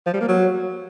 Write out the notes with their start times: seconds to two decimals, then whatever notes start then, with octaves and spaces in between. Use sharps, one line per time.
0.06 F3
0.14 G3
0.21 A#3
0.28 F#3